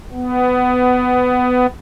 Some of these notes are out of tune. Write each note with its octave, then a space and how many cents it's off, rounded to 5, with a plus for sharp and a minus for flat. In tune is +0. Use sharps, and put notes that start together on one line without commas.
B3 +15